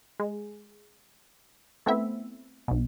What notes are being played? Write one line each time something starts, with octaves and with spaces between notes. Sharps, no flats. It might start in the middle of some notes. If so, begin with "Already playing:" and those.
G#3
A3 B3 C4 E4 E5
B1 B2